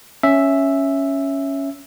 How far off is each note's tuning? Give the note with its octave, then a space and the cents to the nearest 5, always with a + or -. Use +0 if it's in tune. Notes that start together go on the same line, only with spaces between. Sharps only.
C#4 +0 E5 +0